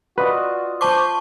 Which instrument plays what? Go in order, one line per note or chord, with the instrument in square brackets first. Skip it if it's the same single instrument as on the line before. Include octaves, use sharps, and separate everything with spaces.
[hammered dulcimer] F4 D5 D#5 [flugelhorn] F#4 [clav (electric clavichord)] B4
[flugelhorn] C5 [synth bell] A5 C#6 D6